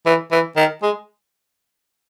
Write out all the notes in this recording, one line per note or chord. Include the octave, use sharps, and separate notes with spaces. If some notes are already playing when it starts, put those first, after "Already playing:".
E3
E3
D#3
G#3